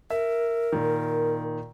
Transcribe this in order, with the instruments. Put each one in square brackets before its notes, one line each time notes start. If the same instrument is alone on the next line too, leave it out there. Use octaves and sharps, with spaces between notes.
[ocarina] A#4 [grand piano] E5
[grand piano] A#2 D#3